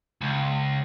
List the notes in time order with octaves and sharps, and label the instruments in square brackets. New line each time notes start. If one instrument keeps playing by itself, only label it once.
[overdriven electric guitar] C#2